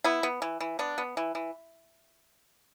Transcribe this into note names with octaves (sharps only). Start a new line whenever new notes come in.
B3 E4
B3
E3
E3
B3 D4
B3
E3
E3